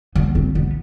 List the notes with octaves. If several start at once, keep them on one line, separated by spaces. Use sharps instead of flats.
B3
C4
B3